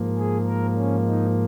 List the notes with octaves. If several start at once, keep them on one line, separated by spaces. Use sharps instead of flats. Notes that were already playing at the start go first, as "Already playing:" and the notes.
Already playing: G#2 F3 A#3
G#4
A#4
C#4
D#4